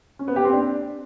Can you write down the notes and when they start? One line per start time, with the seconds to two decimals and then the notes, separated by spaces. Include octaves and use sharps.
0.19 C#4
0.28 B3
0.36 G4
0.45 C4
0.53 D4